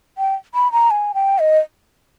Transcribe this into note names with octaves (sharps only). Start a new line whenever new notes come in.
G5
B5
A#5
G#5
G5
D#5